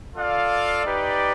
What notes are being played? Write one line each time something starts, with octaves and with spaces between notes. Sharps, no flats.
F4 A4 D5 F5
D#4 G4 B4 D5